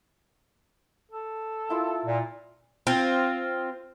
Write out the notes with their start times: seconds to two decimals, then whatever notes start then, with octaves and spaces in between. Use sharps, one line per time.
1.12 A4
1.69 A#3 E4 F4
2.05 A#2
2.87 C4 F4